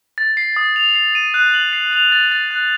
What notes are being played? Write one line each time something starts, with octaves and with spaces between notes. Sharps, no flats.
A6
C7
D#6
F7
C7
D#7
F#6
F#7
C7
F7
A6
A6
F#6